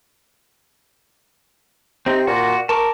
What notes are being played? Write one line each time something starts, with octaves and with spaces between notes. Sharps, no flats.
C3 C4 D#4
A#2 F#4
A#4 A5 C#6 D6